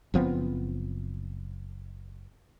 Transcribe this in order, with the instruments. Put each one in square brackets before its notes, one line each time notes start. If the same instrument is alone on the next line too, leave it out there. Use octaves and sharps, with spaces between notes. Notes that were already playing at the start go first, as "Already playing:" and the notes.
[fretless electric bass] F#1 F3 B3 C4